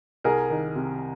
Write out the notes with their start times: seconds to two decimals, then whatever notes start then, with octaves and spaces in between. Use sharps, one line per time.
0.24 C2 G#4 A#4
0.50 D#3
0.75 C3